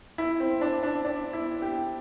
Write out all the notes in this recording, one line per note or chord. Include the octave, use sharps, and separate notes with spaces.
E4
C4
D4
D4
D4
E4
G4